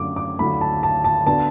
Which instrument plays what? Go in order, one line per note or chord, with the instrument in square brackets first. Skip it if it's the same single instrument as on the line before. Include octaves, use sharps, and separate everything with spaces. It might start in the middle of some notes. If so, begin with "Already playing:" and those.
Already playing: [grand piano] F#2 D3 A3 [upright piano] D6
[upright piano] D6
[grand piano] D2 D3 F#3 A3 E4 [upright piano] B5
[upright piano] A5
A5
A5
[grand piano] D3 B3 D4 F#4 B4 [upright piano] A5